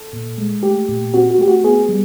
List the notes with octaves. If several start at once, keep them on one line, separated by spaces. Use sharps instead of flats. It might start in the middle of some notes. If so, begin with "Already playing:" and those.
Already playing: A4
A#2
G#3
A3 G4
A#2
C4 F#4
F#4
A3 G4
F#4
B3 G#4
G3